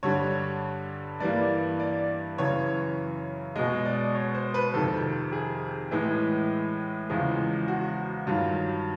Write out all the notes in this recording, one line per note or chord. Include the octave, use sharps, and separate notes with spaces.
G2 D3 G3 C#5
G2 E3 G3 A#3 D5
D5
F#2 C#3 E3 C#5
B2 G#3 D#5
D5
C#5
C5
B4
F2 C3 D#3 A4
G#4
A2 E3 G#3
E2 C#3 F3 G#3
F#4
G2 D#3 F#3 F4